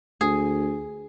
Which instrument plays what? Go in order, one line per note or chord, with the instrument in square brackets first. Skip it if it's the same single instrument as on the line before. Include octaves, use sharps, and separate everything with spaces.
[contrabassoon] D2 [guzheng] G#4